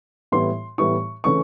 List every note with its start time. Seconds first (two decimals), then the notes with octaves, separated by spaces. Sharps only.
0.32 A2 E3 G3 B3 E4 C6
0.78 A2 E3 G3 B3 E4 C#6
1.24 C#3 E3 A3 C#4 C#6